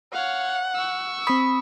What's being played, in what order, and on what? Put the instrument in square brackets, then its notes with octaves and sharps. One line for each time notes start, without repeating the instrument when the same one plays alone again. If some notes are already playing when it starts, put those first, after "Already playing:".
[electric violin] C#5 F5 [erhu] F#5
[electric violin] C#6 E6
[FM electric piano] C4 D#6 [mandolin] B5